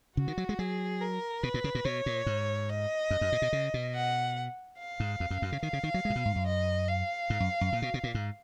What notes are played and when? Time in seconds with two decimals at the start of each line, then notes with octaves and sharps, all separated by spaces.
0.17 C#3 F#4
0.28 D#3
0.38 F#3
0.49 G#3
0.59 F#3 G#4
1.01 A#4
1.43 B2 B4
1.54 A#2
1.64 C#3
1.75 A#2
1.85 B2 C#5
2.06 A#2
2.26 G#2
2.69 D#5
3.10 F#2
3.21 F#2
3.32 A#2
3.42 B2
3.53 C#3
3.74 B2
3.95 F#5
4.78 F5
5.00 G#2
5.20 F2
5.30 F#2
5.42 F#2
5.52 C#3
5.63 D#3 F5
5.73 C#3
5.83 D#3
5.94 F#3
6.05 G#3
6.10 A#2
6.16 B2
6.25 G#2
6.36 F#2
6.47 D#5
6.88 F5
7.30 G#2
7.40 F#2
7.61 F#2
7.73 A#2
7.82 B2
7.94 B2
8.03 A#2
8.15 G#2